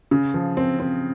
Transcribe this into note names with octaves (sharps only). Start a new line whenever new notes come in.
C#3
F3
C4
C4